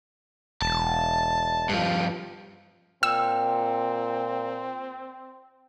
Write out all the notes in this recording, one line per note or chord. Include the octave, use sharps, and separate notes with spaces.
E1 A5
G2 F3
A#2 C4 G5 E6